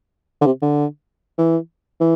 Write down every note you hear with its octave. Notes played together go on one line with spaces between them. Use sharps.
D3
C3
D3
E3
E3